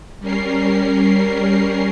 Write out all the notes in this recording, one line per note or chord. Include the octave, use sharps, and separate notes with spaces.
G3 C#4 A#4 C7